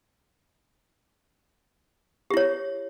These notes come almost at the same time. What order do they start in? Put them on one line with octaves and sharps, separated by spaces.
G4 E4 C#5